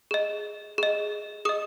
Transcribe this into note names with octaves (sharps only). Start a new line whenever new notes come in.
G#4 D#5
G#4 D#5
G#4 D#5 D#6